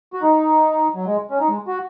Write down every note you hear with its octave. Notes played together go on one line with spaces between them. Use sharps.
F#4
D#4
F#3
G#3
C#4
D#4
G#3
F#4